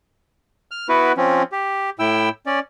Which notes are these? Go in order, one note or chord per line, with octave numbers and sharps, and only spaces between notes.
F6
B3 E4 F#4 B4
F3 C4 C#4
G4
A2 E4 G5 E6
C#4 D5